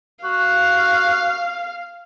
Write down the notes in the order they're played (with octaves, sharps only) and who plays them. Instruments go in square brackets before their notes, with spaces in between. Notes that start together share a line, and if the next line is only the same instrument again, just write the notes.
[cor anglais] F#4 [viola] F5